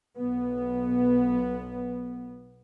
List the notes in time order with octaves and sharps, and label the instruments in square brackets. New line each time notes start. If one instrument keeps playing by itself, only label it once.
[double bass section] B1 B3